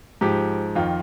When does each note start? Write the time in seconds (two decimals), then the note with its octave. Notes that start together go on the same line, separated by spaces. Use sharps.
0.21 G#2 F3 G4
0.75 F2 D#3 F4